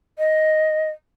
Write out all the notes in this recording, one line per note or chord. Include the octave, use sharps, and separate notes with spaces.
D#5